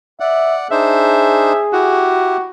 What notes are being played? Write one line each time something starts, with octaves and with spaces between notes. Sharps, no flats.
D5 E5 F#5
D4 D#4 G#4 C5 E5
E4 F#4 G4